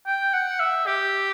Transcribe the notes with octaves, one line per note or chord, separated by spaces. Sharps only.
G5
F#5
E5
G4